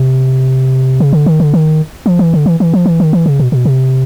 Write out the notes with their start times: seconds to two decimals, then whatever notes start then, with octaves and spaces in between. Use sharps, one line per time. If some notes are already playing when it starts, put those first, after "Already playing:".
Already playing: C3
1.00 C#3
1.13 D3
1.26 D#3
1.40 D3
1.54 D#3
2.06 F3
2.19 E3
2.34 D3
2.46 E3
2.60 E3
2.73 F3
2.86 E3
3.00 D#3
3.13 E3
3.26 C#3
3.39 B2
3.52 B2
3.65 C3